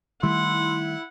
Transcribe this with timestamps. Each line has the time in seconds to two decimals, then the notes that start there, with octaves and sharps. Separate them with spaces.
0.23 D#3 G3 A3 E4 F#5 C6